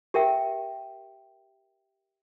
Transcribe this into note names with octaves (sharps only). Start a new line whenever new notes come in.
G4 A#4 E5 G5